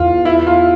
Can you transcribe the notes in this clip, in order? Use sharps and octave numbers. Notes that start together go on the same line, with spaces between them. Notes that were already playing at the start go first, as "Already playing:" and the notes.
Already playing: E2 F4
E4
F4